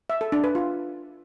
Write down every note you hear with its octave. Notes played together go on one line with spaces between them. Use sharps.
E5
A4
D4
B4
F4